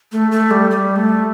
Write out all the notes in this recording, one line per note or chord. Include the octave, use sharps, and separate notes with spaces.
A3
A3
G3
G3
A3